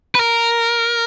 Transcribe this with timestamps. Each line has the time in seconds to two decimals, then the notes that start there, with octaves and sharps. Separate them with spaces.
0.15 B4
0.19 A#4